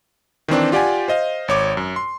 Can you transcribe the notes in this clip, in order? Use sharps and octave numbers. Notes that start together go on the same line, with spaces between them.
D#3 E3 C4 D4
F4 G4 D5 F#5 G#5
C5 D#5 F5
G#1 C#5 D6
F#2
C6